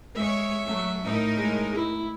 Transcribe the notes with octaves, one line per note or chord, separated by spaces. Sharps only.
G#3 G#4 C#5 E5
F#3 A3
A2 D#4 A#4
G#3
E4